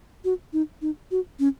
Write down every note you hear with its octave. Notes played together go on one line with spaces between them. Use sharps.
F#4
D#4
D#4
F#4
C#4